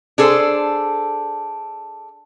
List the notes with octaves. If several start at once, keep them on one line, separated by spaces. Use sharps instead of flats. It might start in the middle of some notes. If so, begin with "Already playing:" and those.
D4 G#4 A4 C5